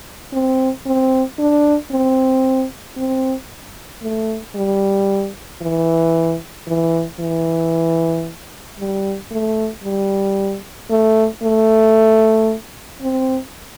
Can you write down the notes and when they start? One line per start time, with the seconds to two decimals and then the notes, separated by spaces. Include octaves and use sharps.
0.33 C4
0.86 C4
1.39 D4
1.91 C4
2.97 C4
4.02 A3
4.55 G3
5.62 E3
6.67 E3
7.20 E3
8.79 G3
9.31 A3
9.84 G3
10.90 A3
11.43 A3
13.02 C4